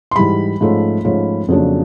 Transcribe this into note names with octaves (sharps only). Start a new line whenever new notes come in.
C6
G#2 E3 G3 B5
G#2 F3 A3 C#4
G#2 F3 A3 C#4
F2 C#3 F#3 A#3 D4